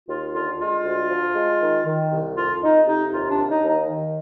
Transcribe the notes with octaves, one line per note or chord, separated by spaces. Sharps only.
D#2 F4
D3 F4
G#3 F4
D2
F3
G#3
D#3
D#3
C2
F2 F4
F2 D#4
C3 D#4
D#2 F4
D4
D#2
D#4
D#2
D#4
D#3